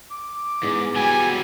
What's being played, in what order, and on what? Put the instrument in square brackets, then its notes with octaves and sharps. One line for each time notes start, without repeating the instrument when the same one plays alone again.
[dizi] D6
[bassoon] E2 [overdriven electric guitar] G#2
[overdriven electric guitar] F#3 G3 [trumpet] G#5